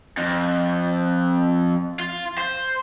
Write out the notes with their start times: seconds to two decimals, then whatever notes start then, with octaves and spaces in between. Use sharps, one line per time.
0.17 F2
1.99 F4
2.38 C5